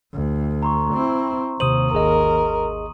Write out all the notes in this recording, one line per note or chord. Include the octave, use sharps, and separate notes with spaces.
D2
A#5 C6 C#6
C4 E4
D#2 C3 C5 D#6 D#7 F#7
G#1 G#4 A#4 D#5